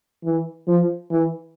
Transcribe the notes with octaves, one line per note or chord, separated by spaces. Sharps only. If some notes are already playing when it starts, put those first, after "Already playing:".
E3
F3
E3